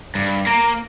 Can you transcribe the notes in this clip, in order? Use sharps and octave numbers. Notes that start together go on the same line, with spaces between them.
G2
A#3 A#5